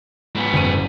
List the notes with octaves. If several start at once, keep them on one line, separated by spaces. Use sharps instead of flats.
G#2 B3
F#1 D#7